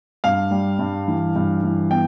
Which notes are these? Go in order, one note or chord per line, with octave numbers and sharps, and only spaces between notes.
G2 F5
G3
G2
E3
G2
E3
B3 G5